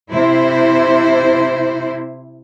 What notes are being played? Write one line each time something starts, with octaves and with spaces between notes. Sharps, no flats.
C3 E4 C5